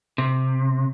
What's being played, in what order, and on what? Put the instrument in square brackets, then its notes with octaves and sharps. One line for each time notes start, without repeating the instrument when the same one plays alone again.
[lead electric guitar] C3